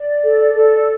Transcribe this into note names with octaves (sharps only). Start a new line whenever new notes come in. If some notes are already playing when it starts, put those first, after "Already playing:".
Already playing: D5
A4
A4